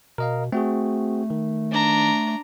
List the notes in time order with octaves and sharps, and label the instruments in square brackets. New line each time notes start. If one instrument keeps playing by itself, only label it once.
[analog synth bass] B2 [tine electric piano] A#4 D#5 F5
[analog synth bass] A3 [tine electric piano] C4 F#4 G#4
[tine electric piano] D#3
[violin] D4 A#5